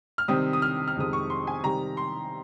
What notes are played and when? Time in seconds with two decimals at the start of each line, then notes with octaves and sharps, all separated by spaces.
0.18 F6
0.28 C3 D#3 G3 C4 D#6
0.53 D#6
0.62 F6
0.88 F6
0.96 F2 C3 D#3 G#3 D#6
1.13 C#6
1.30 C6
1.47 G#5
1.63 C3 D#3 G3 A#5
1.97 C6